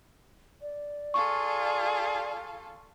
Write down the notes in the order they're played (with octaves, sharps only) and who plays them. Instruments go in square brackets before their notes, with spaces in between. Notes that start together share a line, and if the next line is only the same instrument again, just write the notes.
[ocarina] D5
[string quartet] F4 A4 F5 [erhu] G#4 [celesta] C#6